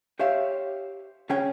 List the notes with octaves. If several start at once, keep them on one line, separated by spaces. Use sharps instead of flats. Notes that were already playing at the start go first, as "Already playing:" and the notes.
G4 C5 C#5 E5 F5
C#3 C#4 G#4 C#5 G5